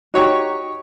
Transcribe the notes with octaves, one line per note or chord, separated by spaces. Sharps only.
D#4 F#4 G4 C#5 A#5 C#6